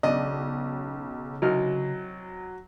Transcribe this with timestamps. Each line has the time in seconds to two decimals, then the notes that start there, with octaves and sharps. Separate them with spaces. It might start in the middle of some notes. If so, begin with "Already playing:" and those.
0.03 B1 C#3 D4 D#5
1.42 C2 F#3 D#4 F6